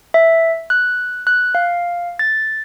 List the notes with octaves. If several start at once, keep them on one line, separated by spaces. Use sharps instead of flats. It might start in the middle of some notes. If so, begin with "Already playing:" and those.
E5
F#6
F#6
F5
A6